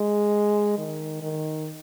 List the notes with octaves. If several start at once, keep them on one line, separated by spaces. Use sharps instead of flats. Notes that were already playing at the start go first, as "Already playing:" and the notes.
Already playing: G#3
D#3
D#3